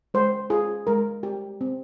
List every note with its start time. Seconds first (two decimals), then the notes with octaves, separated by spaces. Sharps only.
0.14 G#3 C5
0.50 F4 G#4
0.87 G#3 A#4
1.23 G4
1.61 C4